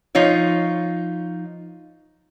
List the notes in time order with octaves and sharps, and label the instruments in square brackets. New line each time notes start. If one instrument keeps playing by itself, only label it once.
[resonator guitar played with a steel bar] F3 D#4 F4 C#5